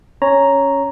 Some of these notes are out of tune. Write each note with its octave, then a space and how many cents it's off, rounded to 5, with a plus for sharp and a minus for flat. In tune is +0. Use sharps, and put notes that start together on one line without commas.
C#4 +0 C#5 +0 A#5 +0